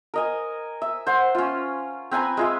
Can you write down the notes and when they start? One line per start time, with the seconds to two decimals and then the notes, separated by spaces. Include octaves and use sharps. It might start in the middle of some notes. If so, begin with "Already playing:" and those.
0.14 A#4 D#5 G#5
0.82 E5
1.06 C5 F#5
1.35 C#4 F4
2.11 C4 B4 G#5 A#5
2.37 G#3 F4 E5